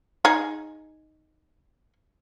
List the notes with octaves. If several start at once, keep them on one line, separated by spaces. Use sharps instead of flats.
D#4 G#4